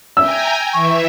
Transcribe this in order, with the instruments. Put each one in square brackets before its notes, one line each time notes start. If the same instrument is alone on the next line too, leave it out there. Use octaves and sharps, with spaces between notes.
[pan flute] E5 [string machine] G5 G#5 A#5 [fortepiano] E6
[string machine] E3 E5 [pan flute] C#6